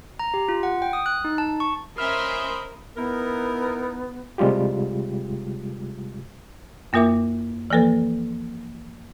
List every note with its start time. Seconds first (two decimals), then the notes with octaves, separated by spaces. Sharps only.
0.19 A#5
0.34 G4
0.49 F4
0.63 F#5
0.82 G5
0.93 D#6
1.06 F#6
1.25 D#4
1.38 A5
1.60 C#6
1.98 C#4 A#4 C5 D#5 E5 B5 C6 F6
2.97 B3 D#4 E4 A#4
4.38 C3 G3 G#3 F4 G4
6.93 F#2 A#3 F4 A#4 E5 D6
7.70 E3 F3 A#3 A4 B4